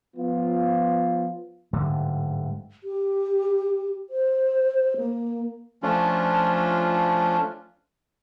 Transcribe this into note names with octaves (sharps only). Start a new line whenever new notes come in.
F3 B3 F4
D1 G#2 D3 G3
G4
C5
A#3
F3 A3 C#4 D4 F4